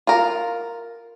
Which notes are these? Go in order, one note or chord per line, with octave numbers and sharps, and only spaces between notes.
F4 A#4